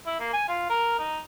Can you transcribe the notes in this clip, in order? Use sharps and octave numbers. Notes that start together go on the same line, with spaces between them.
E4
A#3
G#5
F4
A#4
D#4